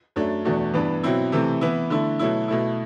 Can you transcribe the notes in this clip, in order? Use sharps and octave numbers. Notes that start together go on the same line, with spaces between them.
F#2 F#3 A3 D4
E2 B2 A3 D4 F#4
G2 E3 B3 D4
B2 F#3 C4 E4
C3 E3 A3 C4
E3 B3 E4
D3 A3 E4
B2 F#3 A3 E4
B2 A3 E4